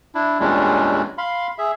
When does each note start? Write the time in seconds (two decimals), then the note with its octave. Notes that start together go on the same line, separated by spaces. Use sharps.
0.15 D4 E4
0.40 E2 A#2 G3 G#3 C#4 D4
1.18 F5 B5 C6
1.58 G#4 E5